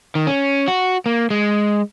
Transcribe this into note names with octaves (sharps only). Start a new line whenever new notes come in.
D#3
C#4
F#4
A#3
G#3